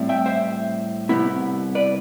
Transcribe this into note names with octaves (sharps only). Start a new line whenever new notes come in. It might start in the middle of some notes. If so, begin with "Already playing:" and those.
Already playing: A2 G3 C4 E4
E5 G5
C5 E5
C2 B2 B3 E4
B4 D5